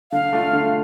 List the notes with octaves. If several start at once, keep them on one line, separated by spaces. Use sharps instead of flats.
D3 F5
A3 D4 F4
D3